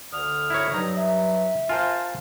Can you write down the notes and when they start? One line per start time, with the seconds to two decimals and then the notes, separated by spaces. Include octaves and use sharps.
0.12 D2 D3 D#6 F6
0.50 E4 A#4 C#5
0.73 G2 F#3 D#4 A#5
0.96 E5
1.69 F4 A#4 C5 G#5 A5